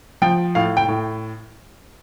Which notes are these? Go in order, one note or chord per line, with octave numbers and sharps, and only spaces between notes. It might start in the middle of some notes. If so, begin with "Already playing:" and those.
F3 G5
A2 F5
G5
A2